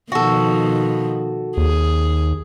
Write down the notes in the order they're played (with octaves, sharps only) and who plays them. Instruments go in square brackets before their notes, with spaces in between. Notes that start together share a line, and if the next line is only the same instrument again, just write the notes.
[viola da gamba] B2 D#3 F3 [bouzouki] F#4 A4
[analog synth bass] D#2 [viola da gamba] G#4